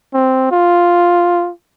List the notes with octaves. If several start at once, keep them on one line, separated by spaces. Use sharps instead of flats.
C4
F4